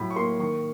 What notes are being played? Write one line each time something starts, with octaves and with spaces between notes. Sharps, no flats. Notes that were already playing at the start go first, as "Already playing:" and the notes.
Already playing: A2 F#3 B5
C#6
A#3 C6
D#3 C#6